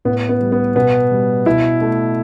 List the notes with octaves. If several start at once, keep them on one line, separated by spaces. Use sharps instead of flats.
A2 B3
B3
G3
B3
B2 B3
G3
B2 E4
A3